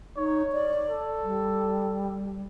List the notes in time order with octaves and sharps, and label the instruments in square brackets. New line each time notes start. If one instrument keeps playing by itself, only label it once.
[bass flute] D#4 [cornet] C#5
[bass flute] D5
[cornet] A4
[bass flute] G3